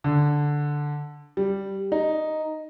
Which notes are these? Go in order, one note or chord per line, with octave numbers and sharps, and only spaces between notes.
D3
G3
D#4